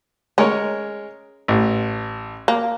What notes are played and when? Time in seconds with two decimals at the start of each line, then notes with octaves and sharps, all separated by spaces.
0.38 G#3 C#4 A#4 C#5
1.48 A1
2.48 A#3